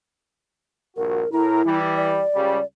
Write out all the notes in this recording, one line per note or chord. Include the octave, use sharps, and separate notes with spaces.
A#1 G2 F#4 A#4
A2 E4 A#4
E3 G3
D5
C#2 C#3 G3